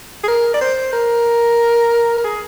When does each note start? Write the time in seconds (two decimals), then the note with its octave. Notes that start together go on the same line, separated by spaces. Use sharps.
0.24 G#4
0.28 A#4
0.54 D5
0.61 C5
0.93 A#4
2.18 A#4
2.24 G#4